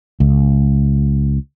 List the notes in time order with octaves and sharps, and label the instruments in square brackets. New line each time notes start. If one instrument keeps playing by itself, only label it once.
[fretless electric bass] C#2